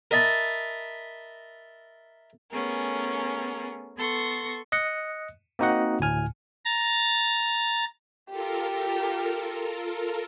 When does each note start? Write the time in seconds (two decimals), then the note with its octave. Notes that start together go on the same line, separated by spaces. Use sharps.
0.11 A#4 D#5 E5 A5 B5
2.52 A3 B3 C#4 G#4 A#4
3.95 B3 A4 C6 C#6 A#6
4.72 D#5 F#6 C#7
5.59 A#3 C4 D#4 F#4 D#5 F#5
6.00 D2 A2 G#5 F6
6.65 A#5 A6
8.30 F4 G4 A4 A#4